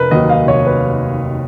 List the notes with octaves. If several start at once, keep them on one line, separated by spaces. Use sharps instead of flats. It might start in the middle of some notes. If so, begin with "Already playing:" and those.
Already playing: F1 A#4 B4
D#2 D#3 F#3 D#5
F5
F1 C#5
B4